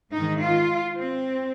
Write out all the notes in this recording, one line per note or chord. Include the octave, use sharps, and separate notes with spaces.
G#2 D#3 D#4
F4
C4